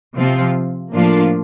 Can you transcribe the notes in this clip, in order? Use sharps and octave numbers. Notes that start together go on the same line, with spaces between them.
C3 F3 C4 F4
A2 F3 A#3 D4 F4